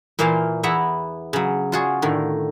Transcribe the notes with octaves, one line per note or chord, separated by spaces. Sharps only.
A#2 E3 A#3 C5 F5 A5
E2 B3 E4 E5 F#5 A#5
C#3 F#3
F4 F#4 G#4
A2 D3 D#3